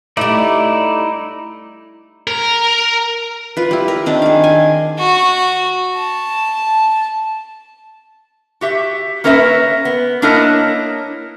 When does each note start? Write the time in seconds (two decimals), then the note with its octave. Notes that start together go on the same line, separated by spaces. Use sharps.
0.17 G3 A3 D#4 E4 D5
2.27 A#4
3.57 F4 B4
3.71 G3 E4
3.88 A#4
4.06 D#3 C4 D4
4.22 G#4 F5
4.44 G#5
4.99 F#4
5.96 A5
8.61 F#4 G4 E5
9.24 A#3 C#4 A#4 B4 D5 E5
9.85 B3
10.22 A#3 D4 E4 A#4 C#5 D#5